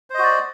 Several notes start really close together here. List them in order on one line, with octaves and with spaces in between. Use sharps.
C5 D#5 F#4 D5